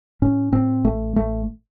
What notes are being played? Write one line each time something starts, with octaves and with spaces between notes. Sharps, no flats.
A2 C#4
A2 C4
A1 A3
A1 A3